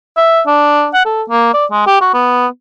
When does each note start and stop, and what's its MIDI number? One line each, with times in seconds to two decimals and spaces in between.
0.17 0.41 76
0.47 0.88 62
0.94 1.05 78
1.05 1.22 69
1.30 1.51 58
1.54 1.65 74
1.71 1.86 56
1.87 2.00 67
2.01 2.09 66
2.14 2.47 59